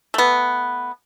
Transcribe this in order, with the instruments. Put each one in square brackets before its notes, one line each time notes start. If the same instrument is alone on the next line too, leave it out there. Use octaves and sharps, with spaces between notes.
[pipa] A3 B3